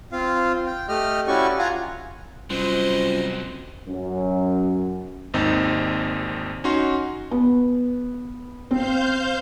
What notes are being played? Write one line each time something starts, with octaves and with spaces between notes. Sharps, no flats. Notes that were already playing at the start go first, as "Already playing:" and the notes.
C4 F4 F5
G5
A3 G4 D#5 F6
C#4 E4 F#4 G4 D5 C#6
F4 F5 F#5 G#5 A#5
C3 F#3 G3 C#4 F4 C5 D#5
F#2
G#1 D#2 C4 D#4
C#4 D#4 F#4 C6
B3
C4 C5 F5 G6